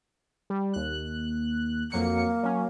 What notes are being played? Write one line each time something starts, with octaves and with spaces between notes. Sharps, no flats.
G3
D#2 F#6
F2 F#3 A#3 C#7
F#3 C#4